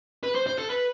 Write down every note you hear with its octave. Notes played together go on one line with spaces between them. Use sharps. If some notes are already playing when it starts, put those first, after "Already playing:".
B4
C5
C5
A4
B4